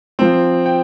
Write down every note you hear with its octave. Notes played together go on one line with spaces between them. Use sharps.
F3 C4
G5